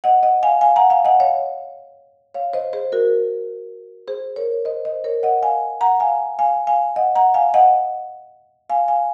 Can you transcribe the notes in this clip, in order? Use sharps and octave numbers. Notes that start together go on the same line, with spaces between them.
D#5 F#5
D#5 F#5
F5 G#5
F5 G#5
F#5 A#5
F5 G#5
D#5 F#5
C#5 F5
C#5 F5
C5 D#5
G#4 C5
F#4 A#4
G#4 C5
A#4 C#5
C5 D#5
C5 D#5
A#4 C#5
D#5 F#5
F5 G#5
F#5 A#5
F5 G#5
F5 G#5
F5 G#5
D#5 F#5
F#5 A#5
F5 G#5
D#5 F#5
F5 G#5
F5 G#5